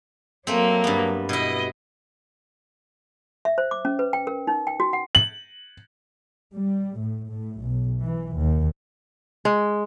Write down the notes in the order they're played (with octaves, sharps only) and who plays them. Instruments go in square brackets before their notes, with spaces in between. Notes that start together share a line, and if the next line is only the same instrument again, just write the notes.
[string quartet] F#3 A#3 [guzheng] A3 C4
[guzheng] G2 B3
[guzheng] B2 E4 [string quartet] D#5
[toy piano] E5
C5
D6
C#4
B4
G5
A#4
D#4
G5
F#4
F#5
[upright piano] F#7
[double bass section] G3
A2
A2
B1
E3
D#2
[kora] G#3